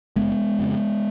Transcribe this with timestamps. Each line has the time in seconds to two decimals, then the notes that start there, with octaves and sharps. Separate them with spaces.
0.16 F#1 G#3 B3
0.59 F2 C#3